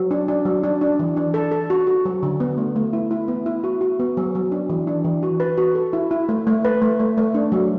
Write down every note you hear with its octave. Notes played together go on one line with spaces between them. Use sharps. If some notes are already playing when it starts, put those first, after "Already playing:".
Already playing: F#3
D4
D4
F#3
D4
D4
E3
D4
A4
A4
F#4
F#4
F#3
D3
B3
A3
A3
E4
E4
B3
E4
F#4
F#4
B3
F#3
F#3
D4
E3
D4
E3
F#4
B4
F#4
A4
E4
E4
A3
A3
B4
A3
A3
A3
D4
F#3